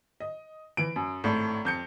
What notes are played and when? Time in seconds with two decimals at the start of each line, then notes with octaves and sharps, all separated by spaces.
0.20 D#5
0.77 E3 D7
0.96 F#2
1.24 G#1 A2
1.65 F2 G6 C#7